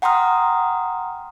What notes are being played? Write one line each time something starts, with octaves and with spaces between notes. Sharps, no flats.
F#5 G5 A#5 C6 D#6 F6